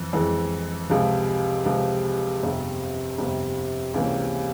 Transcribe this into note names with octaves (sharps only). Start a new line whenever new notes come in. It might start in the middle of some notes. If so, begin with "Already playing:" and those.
Already playing: F2 E3
F2 E3 G#3
C#2 C3 F3 G#3
C#2 C3 F3 G#3
G1 F2 C3
G1 F2 C3
C#2 C3 E3 A#3 C#4